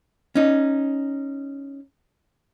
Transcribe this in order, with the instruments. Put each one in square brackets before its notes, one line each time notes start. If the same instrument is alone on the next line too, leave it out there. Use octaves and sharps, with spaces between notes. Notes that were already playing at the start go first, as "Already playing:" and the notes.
[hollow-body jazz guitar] C#4 D#4